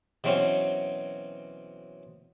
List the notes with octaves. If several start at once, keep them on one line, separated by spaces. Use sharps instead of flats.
B2 E3 F#3 C4 C#4